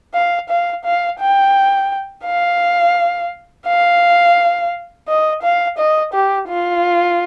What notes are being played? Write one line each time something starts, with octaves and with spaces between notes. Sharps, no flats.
F5
F5
F5
G5
F5
F5
D#5
F5
D#5
G4
F4